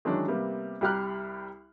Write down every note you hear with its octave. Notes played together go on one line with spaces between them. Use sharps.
D#3 E3 F#3 G#3 C#4 D4
C3 G3 A#3 B3
C2 G3 G4 A#5 F6 F#6